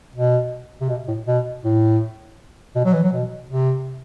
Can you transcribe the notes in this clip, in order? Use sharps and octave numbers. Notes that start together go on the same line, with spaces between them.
B2
C3
B2
A2
B2
A2
B2
F#3
E3
F#3
B2
C3